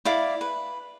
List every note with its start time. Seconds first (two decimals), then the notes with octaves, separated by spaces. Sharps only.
0.05 E4 D5 F5 D6
0.41 B4